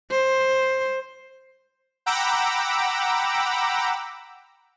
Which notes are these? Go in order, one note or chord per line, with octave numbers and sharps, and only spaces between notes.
C5
F#5 G5 A#5 B5 D6 E6